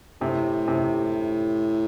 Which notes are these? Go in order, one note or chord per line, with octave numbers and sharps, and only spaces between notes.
A2 C3
C3